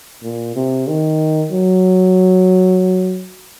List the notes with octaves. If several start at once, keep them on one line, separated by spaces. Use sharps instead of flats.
A#2
C3
D#3
F#3